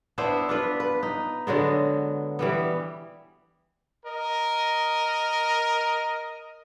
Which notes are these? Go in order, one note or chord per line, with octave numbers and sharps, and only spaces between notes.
B3 D4 E4 C5
D4 F4 B4
B4
D#4
D3 F#3 G#3 B3
E3 G3 B3
A#4 D#5